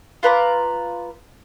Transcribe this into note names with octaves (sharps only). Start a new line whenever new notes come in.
F4 B4 A#5 D6